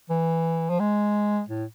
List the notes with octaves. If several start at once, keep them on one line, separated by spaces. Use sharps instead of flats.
E3
F3
G#3
A2